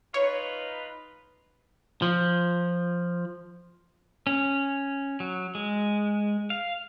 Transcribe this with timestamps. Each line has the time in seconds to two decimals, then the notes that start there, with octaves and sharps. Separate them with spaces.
0.14 D#4 F4 B4 C#5
2.02 F3
4.27 C#4
5.20 F#3
5.55 G#3
6.50 F5